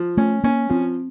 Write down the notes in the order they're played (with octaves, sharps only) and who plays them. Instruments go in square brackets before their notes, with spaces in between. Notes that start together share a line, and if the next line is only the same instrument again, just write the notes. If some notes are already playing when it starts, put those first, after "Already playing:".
Already playing: [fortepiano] F3
[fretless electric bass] A3 [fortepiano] C#4
[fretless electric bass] A#3 [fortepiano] C#4
[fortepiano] F3 [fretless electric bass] C4